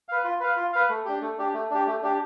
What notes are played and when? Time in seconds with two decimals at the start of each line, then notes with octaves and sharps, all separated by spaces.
0.09 B4 F5
0.24 F4
0.40 B4 F5
0.57 F4
0.73 B4 F5
0.89 A3
1.05 D4 G4
1.21 A3
1.38 D4 G4
1.54 A3
1.70 D4 G4
1.87 A3
2.02 D4 G4